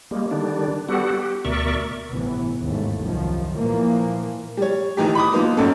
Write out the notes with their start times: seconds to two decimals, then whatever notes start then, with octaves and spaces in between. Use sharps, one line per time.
0.11 G3 G#3 A#3
0.31 D3 D#3 G3 D4
0.89 G3 B3 F#4 G4 A4 F#5
1.14 G4
1.45 D2 B2 A#4 D5 E5 C#6
2.09 G1 A2 C3 E3 B3
2.59 A1 D#2 G#2 A3
3.01 C2 F#2 D#3 F3
3.55 A#2 E3 F3 A#3
4.57 G3 C#5
4.97 A2 D#3 E3 D#4 G4
5.15 B5 D6 D#6
5.33 F3 A#3 B3 D#4
5.57 G#1 F#2 C#4 A4